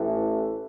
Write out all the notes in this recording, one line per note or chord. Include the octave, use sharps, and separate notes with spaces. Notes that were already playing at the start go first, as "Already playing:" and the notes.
Already playing: A1 A2 E3 A3